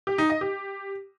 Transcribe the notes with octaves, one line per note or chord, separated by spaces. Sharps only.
G4
D#4
D#5
G4